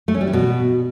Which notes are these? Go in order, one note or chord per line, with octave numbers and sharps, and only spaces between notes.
A3
C#4
G3
E3
B2